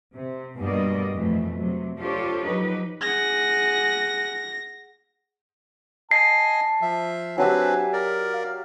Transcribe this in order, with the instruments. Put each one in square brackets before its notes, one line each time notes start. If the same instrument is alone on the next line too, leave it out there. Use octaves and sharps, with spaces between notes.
[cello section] C3
G2 B2 G3 A#3 D5 D#5
F2 B2 E3 A3
C3 F#3
D4 F4 G4 A4 C5 C#5
F3 F#3 D#4 G4 B4
[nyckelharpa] G#4 F#5 [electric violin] A#6
[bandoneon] D#5 G#5 [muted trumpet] A5 [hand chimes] C7
[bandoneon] F3 E5
[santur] F#3 G4 E5 [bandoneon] C4 D4 B4 [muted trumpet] G#5
[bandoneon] A#4 D5
[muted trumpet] F5